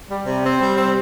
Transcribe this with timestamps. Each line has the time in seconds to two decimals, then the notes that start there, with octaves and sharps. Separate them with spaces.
0.10 G3
0.27 C3
0.43 C4
0.61 G3
0.77 C4